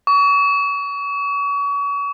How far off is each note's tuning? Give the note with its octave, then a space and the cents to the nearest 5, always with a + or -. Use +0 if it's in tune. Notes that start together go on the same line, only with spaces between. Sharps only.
C#6 +35